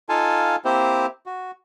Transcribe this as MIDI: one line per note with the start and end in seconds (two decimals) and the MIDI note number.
0.09 0.56 63
0.09 0.56 65
0.09 0.56 69
0.09 0.56 77
0.09 0.56 80
0.09 0.56 81
0.65 1.06 58
0.65 1.06 60
0.65 1.06 64
0.65 1.06 67
0.65 1.06 72
1.26 1.51 66